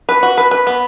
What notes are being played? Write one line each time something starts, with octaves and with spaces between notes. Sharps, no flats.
B4
F#4
B4
B4
B3